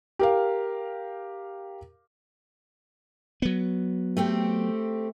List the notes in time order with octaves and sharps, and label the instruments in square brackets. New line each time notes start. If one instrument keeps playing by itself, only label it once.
[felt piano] G4 A#4 F5
[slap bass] F#3 B3
[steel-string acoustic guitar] A3 C4 G4